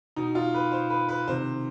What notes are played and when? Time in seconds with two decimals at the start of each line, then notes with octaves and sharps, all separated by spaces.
0.16 B2 D#4
0.35 F4
0.54 B4
0.72 C5
0.90 B4
1.09 B4
1.27 C3 D#3 C5